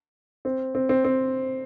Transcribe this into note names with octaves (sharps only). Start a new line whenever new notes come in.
C4
C4
C4
C4